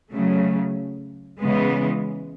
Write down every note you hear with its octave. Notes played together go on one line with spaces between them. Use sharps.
C#3 F#3 A3
C#3 E3 G#3 B3